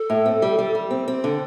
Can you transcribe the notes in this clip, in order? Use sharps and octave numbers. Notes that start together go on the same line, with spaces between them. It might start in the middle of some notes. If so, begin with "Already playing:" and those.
Already playing: A4
A2
C4
G3
G3
G3
C4
C4
D3 A4